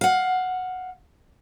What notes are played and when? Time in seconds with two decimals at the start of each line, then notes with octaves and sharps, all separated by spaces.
0.01 F5 F#5